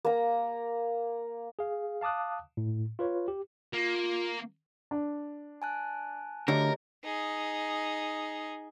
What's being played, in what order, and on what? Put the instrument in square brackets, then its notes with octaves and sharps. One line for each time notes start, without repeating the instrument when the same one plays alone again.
[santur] A#3 A#5
[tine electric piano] G#4 F5
F5 A5 D6 D#6 F#6
A2
F4 B4 C#5
G4
[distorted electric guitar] A#3 [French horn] F4
[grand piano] D4
[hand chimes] G#5 A5 F#6
[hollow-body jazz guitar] D2 D3 [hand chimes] G4 C#5 D#5 [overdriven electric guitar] A#4
[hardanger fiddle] D#4 G#4